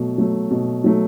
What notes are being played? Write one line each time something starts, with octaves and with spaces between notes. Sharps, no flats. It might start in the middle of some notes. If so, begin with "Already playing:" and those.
Already playing: B2 F#3 A3
F#3 A3
B2
F#3 A3